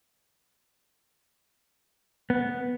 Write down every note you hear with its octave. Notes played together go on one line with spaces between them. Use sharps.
B3